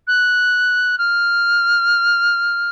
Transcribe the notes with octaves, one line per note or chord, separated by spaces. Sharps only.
F#6
F6